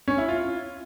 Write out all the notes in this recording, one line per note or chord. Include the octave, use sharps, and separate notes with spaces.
C#4
E4
F4